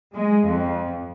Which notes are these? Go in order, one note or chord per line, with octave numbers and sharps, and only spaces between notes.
G#3
F2